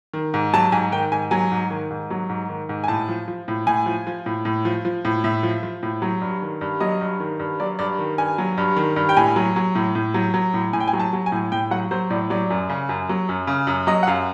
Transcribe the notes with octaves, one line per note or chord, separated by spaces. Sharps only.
D#3
G#2
F#3 A5
G#2 G#5
D#3 G5
G#2 G#5
F#3 G#5
G#2
D#3
G#2
F#3
G#2
D#3
G#2
G#5
A2 A5
F3
F3
A2
A2 G#5
F3
F3
A2
A2
F3
F3
A2
A2 E5
F3
F3
A2
F#3
G2
D#3
G2
F#3 D#5
G2
D#3
G2
F#3 D5
G2 D5
D#3
G2 G#5
F#3
G2
D#3
G2
G5
A2 G#5
F#3
F#3
A2
A2
F#3
F#3
A2
A2 G#5
G5
G#5
F#3
A5
F#3
G#5
A2
A2 G5
F#3 F#5
F#3 C5
A2 D5
F#3 D5
F#2
C#3
F#2
F#3
F#2
C#3
F#2
F#3 D#5
F#5
F#2 F5